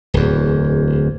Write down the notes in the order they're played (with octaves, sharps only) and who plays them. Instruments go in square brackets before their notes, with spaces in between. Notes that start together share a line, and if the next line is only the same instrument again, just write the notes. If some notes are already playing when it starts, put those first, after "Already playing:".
[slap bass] D1 E2